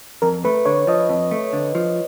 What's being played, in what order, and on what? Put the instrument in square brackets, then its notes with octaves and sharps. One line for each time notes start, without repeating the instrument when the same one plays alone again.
[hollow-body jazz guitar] F2 [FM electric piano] A#4
[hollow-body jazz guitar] A3 [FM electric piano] B4
[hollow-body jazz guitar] D3 [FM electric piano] C#5
[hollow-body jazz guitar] F3 [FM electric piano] D#5
[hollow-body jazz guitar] F2
A3
D3
F3